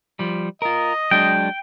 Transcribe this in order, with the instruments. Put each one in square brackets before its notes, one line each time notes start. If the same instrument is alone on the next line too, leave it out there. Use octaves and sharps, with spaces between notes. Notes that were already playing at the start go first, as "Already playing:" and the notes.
[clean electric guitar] F3 G3
[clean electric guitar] F4 A#4 [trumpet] D#5
[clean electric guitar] F#3 G#3 D4 [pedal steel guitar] G5